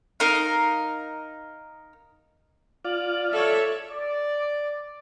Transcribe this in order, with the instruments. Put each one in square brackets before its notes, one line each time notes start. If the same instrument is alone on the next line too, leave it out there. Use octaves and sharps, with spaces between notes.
[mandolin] D#4 A#4 F5
[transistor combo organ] F4 [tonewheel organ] D5
[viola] A4 [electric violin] C#5 E5
[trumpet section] D5